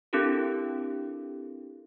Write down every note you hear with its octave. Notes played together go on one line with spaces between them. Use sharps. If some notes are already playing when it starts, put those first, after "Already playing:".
C4 D4 E4 G4 A4 A#4